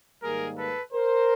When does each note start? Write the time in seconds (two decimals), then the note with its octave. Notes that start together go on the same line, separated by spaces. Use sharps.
0.23 G#2 D#3 G3 A#3 G#4 A#4
0.58 A4 B4
0.93 A#4 C5